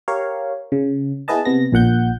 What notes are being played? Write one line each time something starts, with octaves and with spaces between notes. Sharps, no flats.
G4 A#4 C#5 F5
C#3
B3 E4 G#4 B4 D#5 A5
C3 B3 A#6
A#1 A#2 F#5 G6